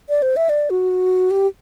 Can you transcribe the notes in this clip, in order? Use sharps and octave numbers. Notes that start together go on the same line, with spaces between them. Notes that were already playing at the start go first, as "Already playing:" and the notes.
D5
C5
E5
D5
F#4
G4